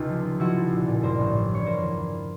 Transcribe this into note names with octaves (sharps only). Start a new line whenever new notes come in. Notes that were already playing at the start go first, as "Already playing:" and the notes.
Already playing: C#2 C3 D#4 F4
F3
F3
F3 E4 F#4
F3
A#1
A#2
G2 A#4 C5
A1
E3
G2 C#5
E2 A#4 C5
E2
E2